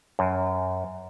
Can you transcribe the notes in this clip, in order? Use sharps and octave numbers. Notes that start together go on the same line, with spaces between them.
F#2